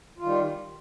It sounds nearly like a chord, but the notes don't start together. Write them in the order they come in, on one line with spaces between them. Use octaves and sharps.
F4 D#3 G3